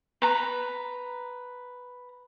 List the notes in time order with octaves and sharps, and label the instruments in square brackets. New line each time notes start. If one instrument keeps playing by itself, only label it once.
[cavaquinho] B4 A#5